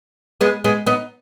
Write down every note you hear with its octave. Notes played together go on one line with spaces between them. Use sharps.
G#3 B3
G#3 B3
B3 D#4